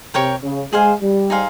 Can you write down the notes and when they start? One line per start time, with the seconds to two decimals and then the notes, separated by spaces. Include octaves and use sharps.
0.14 C3 A#4 C#5 G5 C#6
0.43 C#3
0.73 G#3 G#4 C5 F5 G#5
1.01 G3
1.30 D#4 G#4 C5 F5